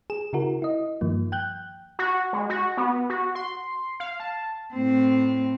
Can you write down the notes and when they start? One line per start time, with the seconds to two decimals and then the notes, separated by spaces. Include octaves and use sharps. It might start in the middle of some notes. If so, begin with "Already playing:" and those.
0.10 G#4 E7
0.33 C#3 E4 F#4 A#4
0.62 E4 D#5
1.01 G2 D#3 F3 A#3
1.32 G5 F#6 G6
1.99 F#4
2.33 G#3
2.50 F#4
2.77 B3
3.10 F#4
3.35 C6
4.00 F5
4.20 A5
4.74 A2 C4